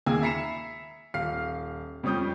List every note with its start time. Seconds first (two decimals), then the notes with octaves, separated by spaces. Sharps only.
0.06 D#2 A#3 G#4 G#5 E6
0.22 E5 A#5 B5 C7 C#7 E7
1.14 D#1 F5 F6 C7
2.03 F2 G3 C#4 D#6 G6